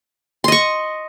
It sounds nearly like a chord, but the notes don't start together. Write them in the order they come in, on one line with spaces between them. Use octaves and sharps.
C6 D#5 C#6